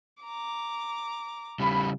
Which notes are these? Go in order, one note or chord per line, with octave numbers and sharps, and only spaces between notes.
A#5 D6
C#3 G3 B5